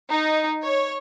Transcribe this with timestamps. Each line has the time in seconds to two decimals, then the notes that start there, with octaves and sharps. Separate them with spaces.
0.11 D#4
0.65 C#5